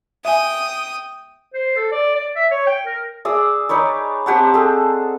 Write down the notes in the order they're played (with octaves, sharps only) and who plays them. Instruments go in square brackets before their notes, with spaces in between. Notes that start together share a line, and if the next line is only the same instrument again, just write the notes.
[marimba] E5 G#5 [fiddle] G5 D#6
[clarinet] C5
A4
D5
D5
E5
C#5
G5
A#4
[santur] G#4 D5 D#6 E6
D#4 B4 C#5 D5
C4 G4 F#5 A5
G#4 A4